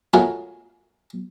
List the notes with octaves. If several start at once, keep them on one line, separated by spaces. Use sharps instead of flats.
G#3 A3 F4 F#4 A#4 C#5